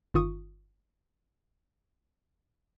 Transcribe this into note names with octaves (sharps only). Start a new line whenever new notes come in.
G1 D#3 F4 C#6 D#6